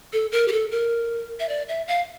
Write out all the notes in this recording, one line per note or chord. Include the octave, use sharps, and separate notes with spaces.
A4
A#4
G4
A4
A#4
E5
D5
E5
F5